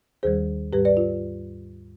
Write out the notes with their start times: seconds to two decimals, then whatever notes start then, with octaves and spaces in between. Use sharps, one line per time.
0.23 D#2 D#3 G3 G#4 C5
0.73 G#2 G3 G4 B4
0.85 B4 D5
0.97 F4